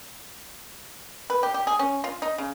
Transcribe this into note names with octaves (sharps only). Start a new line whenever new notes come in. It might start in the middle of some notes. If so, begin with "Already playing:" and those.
B4
G4
G4
G#4
C#4
F4
D#4
C#3